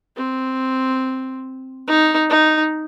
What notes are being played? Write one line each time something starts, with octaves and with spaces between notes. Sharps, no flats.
C4
D#4
D#4